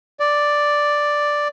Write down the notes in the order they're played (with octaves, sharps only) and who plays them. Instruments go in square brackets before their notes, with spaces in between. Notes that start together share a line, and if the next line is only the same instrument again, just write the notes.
[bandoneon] D5